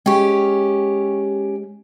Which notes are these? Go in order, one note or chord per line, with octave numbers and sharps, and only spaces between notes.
G#3 C#4 G4 G5 C#6